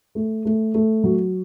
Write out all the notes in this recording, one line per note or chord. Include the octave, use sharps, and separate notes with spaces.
A3
A3
A3
F#3